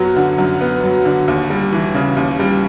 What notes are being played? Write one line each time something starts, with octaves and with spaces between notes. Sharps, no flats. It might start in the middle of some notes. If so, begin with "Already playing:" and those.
Already playing: F#2 F#3 B3
D3
F#2
B3
F#3
D3
D#2
G3
E3
C#3
D#2
G3